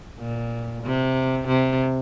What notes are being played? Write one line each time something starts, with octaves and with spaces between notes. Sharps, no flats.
A#2
C3
C3